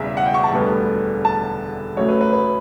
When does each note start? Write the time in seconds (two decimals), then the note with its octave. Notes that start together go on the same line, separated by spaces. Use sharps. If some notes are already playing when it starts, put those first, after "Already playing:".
Already playing: E1 E2 C#3 G3 E5
0.17 F#5
0.26 G5
0.34 C#6
0.44 A5
0.53 E1 D2 D3 G3 B3
1.25 A5
1.97 A1 A2 F#3 A3 C#5
2.09 B4
2.21 B4
2.33 B4